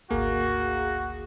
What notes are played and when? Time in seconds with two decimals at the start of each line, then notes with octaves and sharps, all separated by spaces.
0.11 G#1 D2 A#3 F#4 G#4